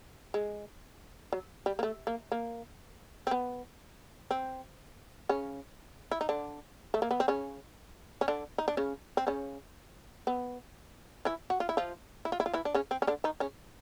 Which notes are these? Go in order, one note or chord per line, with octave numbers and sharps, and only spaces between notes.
G#3
F#3
G3
A#3
A3
A#3
A#3
C4
B3
C4
C#3 C#4
E4
D#4
D3 D4
A3
A#3
B3
C4
C#3 C#4
C#4
D3 D4
D#4
D4
C#3 C#4
C4
C#3 C#4
B3
E3 E4
F#4
F4
E4
F3 F4
E4
F4
E4
F4
E3 E4
D4
C#3 C#4
C4
C#4
D3 D4
D#3 D#4
C#3 C#4